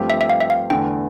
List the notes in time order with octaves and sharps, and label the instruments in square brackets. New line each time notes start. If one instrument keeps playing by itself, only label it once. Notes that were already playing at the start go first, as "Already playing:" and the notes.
Already playing: [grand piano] G2 F3 A3 C4 G4
[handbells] E5
E5
F5
E5
F5
[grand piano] E2 D3 A3 [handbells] G5